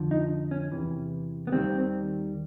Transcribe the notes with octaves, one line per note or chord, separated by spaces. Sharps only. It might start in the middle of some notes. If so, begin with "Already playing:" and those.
Already playing: F2 D3 F3
D#4
C#4
E2 C3 E3
B3
D#2 D#3 G3 C4